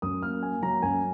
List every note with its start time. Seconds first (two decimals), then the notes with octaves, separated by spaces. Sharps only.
0.02 F#2 D#6
0.22 A#3 F6
0.43 A#3 G#5
0.63 F#3 A#5
0.82 F#2 G#5